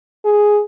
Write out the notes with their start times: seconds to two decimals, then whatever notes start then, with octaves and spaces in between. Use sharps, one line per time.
0.25 G#4